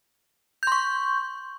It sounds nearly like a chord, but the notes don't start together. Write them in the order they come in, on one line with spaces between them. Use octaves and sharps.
G6 C6 C#6